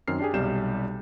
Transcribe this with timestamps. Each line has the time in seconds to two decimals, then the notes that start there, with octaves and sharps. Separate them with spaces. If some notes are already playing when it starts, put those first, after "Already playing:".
0.08 F#2 D#3 C4 F6 C7
0.19 D4 G4 G#4
0.33 B1 C3 G3 G6 E7